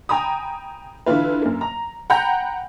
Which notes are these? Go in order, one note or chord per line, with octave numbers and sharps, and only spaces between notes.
G5 G#5 A#5 B5 D#6
D3 E3 E4 F4 B4
F#2 A#3
A#5
F#5 G5 A#5 B5 G6